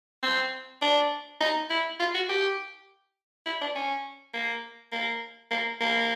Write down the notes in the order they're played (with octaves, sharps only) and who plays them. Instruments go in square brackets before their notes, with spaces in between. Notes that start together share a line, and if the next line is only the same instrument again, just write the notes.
[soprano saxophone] C4
D4
D#4
E4
F4
F#4
G4
E4
D4
C#4
A#3
A#3
A#3
A#3